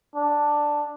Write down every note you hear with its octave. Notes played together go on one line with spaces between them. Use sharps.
D4